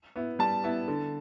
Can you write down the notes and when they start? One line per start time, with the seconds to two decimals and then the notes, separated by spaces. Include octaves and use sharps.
0.16 B3 E4
0.39 G3 A5
0.64 B3 E4
0.88 D3